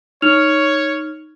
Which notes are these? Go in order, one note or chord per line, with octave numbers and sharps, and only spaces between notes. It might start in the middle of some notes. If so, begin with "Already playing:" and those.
D#4 C#5 F6 F7